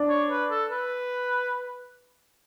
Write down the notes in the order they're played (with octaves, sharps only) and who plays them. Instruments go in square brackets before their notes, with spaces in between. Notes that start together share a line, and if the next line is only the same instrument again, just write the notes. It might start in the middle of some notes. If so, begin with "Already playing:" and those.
Already playing: [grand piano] D4
[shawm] C#5
B4
A4
B4